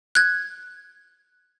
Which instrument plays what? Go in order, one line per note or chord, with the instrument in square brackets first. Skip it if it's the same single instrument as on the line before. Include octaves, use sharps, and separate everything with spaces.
[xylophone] F#6 G#6